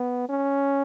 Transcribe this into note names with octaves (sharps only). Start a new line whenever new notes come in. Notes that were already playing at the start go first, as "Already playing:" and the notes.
Already playing: B3
C#4